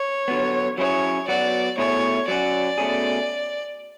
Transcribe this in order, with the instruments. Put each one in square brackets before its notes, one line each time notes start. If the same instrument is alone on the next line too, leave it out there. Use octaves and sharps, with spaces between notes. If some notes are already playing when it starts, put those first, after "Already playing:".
Already playing: [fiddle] C#5
[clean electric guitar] D3 F#3 B3
[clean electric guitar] F#3 C#4 E4 G#4 [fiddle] C#5
[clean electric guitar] F#3 B3 F#4 [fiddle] D5
[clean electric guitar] B2 A3 E4 G#4 [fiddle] C#5
[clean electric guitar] F#3 C#4 F#4 [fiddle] D5
[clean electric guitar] B2 A3 C#4 G#4